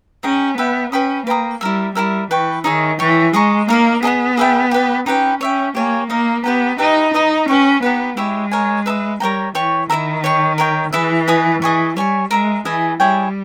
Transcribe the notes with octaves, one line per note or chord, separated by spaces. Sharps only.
C#4 D#4 G#4 D#5 G5
B3 B4 E5 G5
C#4 B4 G5 B5 D#6
A#3 B4 G5 A#5 D#6
G3 E4 A#4 E5
G3 E4 G4 A#4 E5
E3 B4 G5 C#6
D#3 D#4 G#4 C#5 E5
E3 C#5 G5 C#6
G#3 G#4 D#5 A#5 C#6
A#3 D#4 A#4 D#5
B3 G#4 D#5 A#5 D#6
G#4 B4 E5 G5
G4 B4 D#5
C#4 D#4 G4 B4 G5
C#4 C#5 E5 G5
A#3 G4 C#5 G#5
A#3 D#4 A#4 D#5
B3 G4 B4 G5 A#5
D#4 G4 B4 E5 A#5
D#4 B4 D#5 A#5 D#6
C#4 B4 G5 C#6
B3 D#4 G4 B4
G#3 E4 G4 C#5 E5
A#4 C#5 G#5
B4 E5 A#5 D#6
G3 A#4 C#5 G5 A#5
E3 C#5 G5 C#6
D#3 E4 A#4 E5 A#5
C#5 G5 C#6
A#4 C#5 G5
E3 E4 G#4 B4 E5
B4 D#5 G#5 D#6
E3 G#4 D#5 G#5 C#6
G3 C#5 G#5 C#6
G#3 A#4 E5 A#5
E3 E4 G#4 D#5 G#5
G3 E4 G#4 C#5 G5